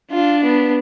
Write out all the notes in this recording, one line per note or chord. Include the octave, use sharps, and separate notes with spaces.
D4 F4
B3